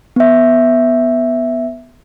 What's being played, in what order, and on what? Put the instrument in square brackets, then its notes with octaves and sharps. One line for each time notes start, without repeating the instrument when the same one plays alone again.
[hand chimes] B3 E5